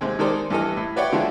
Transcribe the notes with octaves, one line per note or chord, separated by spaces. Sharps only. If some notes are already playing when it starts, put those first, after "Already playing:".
D#2 C3 G#3 C4
D#3 G#3 A4 A#4 C5 D5
G2 E3 A4 D#5 F6
A2
B4 C#5 D5 E5 F#5 G5
D3 F3 G#3 D4 E4